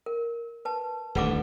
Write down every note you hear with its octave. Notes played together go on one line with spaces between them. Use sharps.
A#4
B4 A5
D#1 D2 A2 B4 F#5 D6